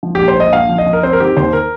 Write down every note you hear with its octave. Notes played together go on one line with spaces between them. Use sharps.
F3
A#1 G4
C5
A#1 D#5
A#1 F5
F3
D#5
F3
A#4
C4 C5
A#4
D#3 G4
D#2 C5
A#4